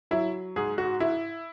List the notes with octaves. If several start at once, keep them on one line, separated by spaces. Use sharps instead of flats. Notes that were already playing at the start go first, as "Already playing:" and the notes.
F#3 E4
G#2 G#4
F#4
E4